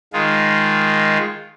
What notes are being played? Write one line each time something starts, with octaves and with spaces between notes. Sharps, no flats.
D#3 G#3 F4